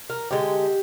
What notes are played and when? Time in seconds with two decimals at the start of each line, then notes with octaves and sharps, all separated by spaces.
0.10 A#4
0.31 D3 G#3 G4